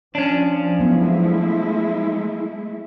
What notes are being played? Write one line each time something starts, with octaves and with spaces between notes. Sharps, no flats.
F3 C#4 D4
F#3 G#3 A3 B3 E4